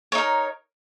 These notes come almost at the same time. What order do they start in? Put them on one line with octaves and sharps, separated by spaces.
C#5 D#4 A#4